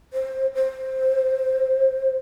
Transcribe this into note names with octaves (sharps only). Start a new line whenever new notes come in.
C5
C5